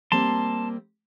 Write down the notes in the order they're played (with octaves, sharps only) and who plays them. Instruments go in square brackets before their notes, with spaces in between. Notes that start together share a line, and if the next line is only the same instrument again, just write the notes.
[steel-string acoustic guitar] G3 A#3 C4 [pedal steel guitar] A5 C6